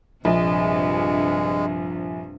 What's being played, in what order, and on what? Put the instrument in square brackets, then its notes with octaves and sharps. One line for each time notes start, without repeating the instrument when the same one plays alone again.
[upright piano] A#1 [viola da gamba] G2 C3 [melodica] G#3